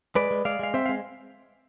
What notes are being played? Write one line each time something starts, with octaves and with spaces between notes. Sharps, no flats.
G#3 B4 D5
G#3
G#3 D5 F5
G#3 F5
C4 C5 E5
G#3 F5